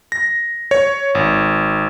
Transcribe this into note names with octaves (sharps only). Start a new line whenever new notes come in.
A#6
C#5
G#1